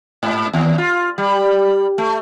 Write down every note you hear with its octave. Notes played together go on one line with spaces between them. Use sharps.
G#2
D#2
F4
G3
A3